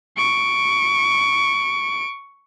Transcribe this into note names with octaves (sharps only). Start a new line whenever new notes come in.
C#6 D7